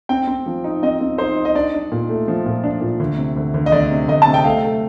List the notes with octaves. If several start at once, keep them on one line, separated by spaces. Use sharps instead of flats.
C4 G5
C4
F3
D#4
C4 D#5
C4
D#4 C5
D#4
D#5
D4 D5
D4
A#2
A3
F3
A#2
D4
A#2
D2
C3
D2
D2
D#5
D2 D5
C3
D2 D#5
A5
C3
G5
A3 F5
A3